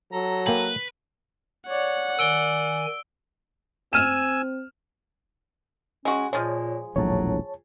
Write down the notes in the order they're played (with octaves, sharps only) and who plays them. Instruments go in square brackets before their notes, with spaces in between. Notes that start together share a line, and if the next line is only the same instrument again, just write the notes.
[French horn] F#3 [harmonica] A4 A#5
[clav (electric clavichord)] A#3 G5 G#5 [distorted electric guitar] B4
[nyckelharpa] C#5 D5 [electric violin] F#5
[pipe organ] D#3 G#5 [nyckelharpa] D5 [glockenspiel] E6 D7 G7
[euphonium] C4 [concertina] G#5 E6 [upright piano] F6 D#7 E7
[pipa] G#3 F#4 [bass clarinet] C#4
[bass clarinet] A#2 [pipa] F3 G#3 [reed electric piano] C#5
[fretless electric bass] E1 A#1 A2 [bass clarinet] F#3 [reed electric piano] C#5 A5